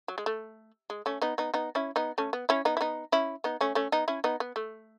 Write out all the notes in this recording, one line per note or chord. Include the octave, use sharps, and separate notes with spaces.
F#3
G#3
A3
G#3
A3 C#4
B3 D#4
B3 D#4
B3 D#4
C#4 E4
B3 D#4
A3 C#4
B3
C#4 E4
B3 D#4
E4
B3 D#4
C#4 E4
B3 D#4
A3 C#4
A3 C#4
B3 D#4
C#4 E4
B3 D#4
B3
A3